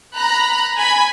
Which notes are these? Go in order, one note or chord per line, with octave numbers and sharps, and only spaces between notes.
A#5 B5 F#6
G#5 B5 G#6